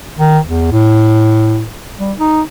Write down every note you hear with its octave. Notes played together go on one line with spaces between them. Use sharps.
D#3
E2
A2
G3
D#4